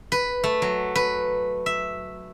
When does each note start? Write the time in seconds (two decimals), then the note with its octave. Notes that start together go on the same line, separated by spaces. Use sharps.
0.12 B4
0.44 A3
0.62 F#3
0.95 B4
1.66 E5